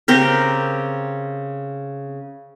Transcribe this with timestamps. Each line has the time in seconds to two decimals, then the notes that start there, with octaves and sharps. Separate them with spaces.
0.08 C#3 C4 G4 A#4